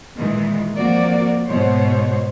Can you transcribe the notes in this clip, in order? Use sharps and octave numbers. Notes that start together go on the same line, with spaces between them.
A#2 D#3 E3 G#3
F3 A#3 C4 F#4 A#4 D5
G#2 B2 C5 C#5